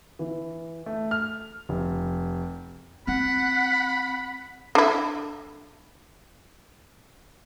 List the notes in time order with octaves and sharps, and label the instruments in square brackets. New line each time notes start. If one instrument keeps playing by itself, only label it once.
[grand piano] E3
A3
F6
F1
[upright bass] C4 [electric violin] F#5 [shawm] B5
[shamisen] D3 E4